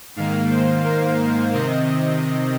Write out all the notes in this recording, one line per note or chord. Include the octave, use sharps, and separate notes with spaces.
G#2 D#3 A#3 F5
C5
A#4
C3 D#3 C4 D#5